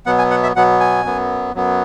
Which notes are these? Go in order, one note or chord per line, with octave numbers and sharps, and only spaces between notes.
B2 F#3 B3 F#5
G#5
F#5
E5
B2 F#3 B3 F#5
G#5
F#2 F#3 B3
F#2 F#3 B3